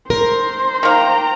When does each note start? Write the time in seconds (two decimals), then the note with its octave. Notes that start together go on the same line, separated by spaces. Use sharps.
0.10 A#4 C5
0.83 D#3 A#3 G5 A#5